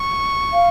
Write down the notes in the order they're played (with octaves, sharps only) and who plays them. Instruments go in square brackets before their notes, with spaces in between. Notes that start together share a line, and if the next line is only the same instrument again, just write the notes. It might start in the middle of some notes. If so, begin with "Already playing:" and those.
Already playing: [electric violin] C#6
[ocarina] F5